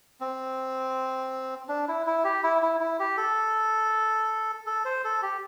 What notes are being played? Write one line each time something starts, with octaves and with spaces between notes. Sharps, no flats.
C4
D4
E4
E4
G4
E4
E4
E4
G4
A4
A4
C5
A4
G4